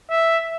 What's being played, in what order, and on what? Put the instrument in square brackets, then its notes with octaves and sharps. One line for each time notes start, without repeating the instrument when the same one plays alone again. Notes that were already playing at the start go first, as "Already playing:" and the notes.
[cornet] E5